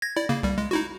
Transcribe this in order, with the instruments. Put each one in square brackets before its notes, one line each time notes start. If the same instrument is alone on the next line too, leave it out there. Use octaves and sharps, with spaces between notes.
[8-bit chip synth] G#6 A#6
E4 D5
C#3 A#3
C2 G3
G#3
D#4 E4 F#4